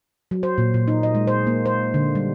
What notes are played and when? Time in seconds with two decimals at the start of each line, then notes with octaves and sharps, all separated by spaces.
0.31 F#3
0.43 C5
0.58 A#2
0.74 A#2
0.88 D#4
1.03 D#5
1.15 G#3
1.27 C5
1.47 A#3
1.66 C5
1.94 D3
2.15 G3